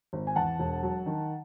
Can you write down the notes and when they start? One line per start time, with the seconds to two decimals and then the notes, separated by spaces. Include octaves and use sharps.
0.13 G#1
0.27 G#5
0.36 E2 F#5 A5
0.60 E1
0.83 F#3
1.06 D#3